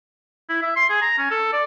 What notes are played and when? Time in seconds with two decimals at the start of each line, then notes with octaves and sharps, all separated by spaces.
0.49 E4
0.62 E5
0.76 C6
0.90 G#4
1.02 A#5
1.18 C#4
1.31 A4
1.53 D5